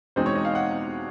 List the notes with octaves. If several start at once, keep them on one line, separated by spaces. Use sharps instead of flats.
E2 B2 G#3 C4 D#4 C5
C#5
D#5
F5
F#5